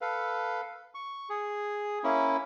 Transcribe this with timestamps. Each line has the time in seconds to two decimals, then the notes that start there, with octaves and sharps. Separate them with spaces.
0.01 A4 B4 F5
0.95 C#6
1.30 G#4
2.04 A#3 C#4 E4